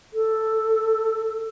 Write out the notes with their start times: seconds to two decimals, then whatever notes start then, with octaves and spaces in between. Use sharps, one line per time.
0.13 A4